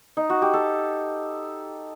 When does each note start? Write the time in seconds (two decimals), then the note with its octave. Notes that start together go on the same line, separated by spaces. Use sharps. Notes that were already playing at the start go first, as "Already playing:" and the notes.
0.17 D#4
0.30 F#4
0.42 G4
0.53 A4